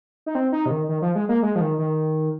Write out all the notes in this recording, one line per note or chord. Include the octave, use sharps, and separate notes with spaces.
D#4
C4
D#4
C3
D#3
D#3
F3
G#3
A#3
G#3
F3
D#3
D#3